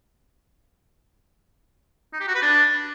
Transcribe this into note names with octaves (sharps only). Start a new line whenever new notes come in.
D#4
G4
F#4
B4
D4